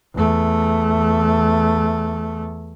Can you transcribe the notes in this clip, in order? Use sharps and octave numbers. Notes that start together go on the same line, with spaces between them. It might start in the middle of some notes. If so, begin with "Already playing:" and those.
E2 A3